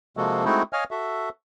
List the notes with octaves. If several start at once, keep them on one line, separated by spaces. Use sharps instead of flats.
C3 F3 G#3 A#3 F#4 A4
G#3 A3 C4 D#4 E4 F#4
C#5 D#5 F5 G#5 F6
F#4 A4 E5